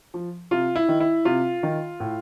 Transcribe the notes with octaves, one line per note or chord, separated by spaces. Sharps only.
F3
C3 F4
E4
D#3
E4
C3 F4
D#3
A2